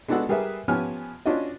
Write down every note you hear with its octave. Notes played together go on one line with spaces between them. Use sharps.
G#3 B3 D4 F#4 A4 F#5
G3 G#4 A#4 B4 E5
F3 B3 C#4 G4 G#5 F6
C#4 D4 F4 F#4 D#5